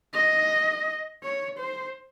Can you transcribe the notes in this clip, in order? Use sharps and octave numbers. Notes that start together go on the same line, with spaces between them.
D#5
C#5
C5